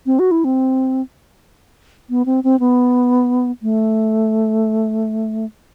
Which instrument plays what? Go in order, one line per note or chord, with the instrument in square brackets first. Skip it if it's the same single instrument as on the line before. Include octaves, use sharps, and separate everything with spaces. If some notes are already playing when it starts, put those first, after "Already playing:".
[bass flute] C4
F#4
E4
C4
B3
C4
C4
B3
A3